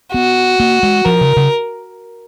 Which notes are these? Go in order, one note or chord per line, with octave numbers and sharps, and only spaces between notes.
B3 F#4
A#3
G#3
F3 A#4
C#3
C#3